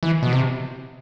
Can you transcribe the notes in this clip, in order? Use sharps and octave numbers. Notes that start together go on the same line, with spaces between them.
E3
B2
C3